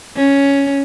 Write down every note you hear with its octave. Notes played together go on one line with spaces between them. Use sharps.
C#4